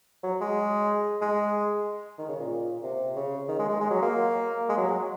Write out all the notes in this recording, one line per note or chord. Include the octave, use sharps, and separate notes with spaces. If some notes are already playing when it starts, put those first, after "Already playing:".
F#3
G#3
G#3
D#3
C#3
A#2
C3
C#3
D#3
G#3
G#3
G#3
F#3
A#3
G#3
F#3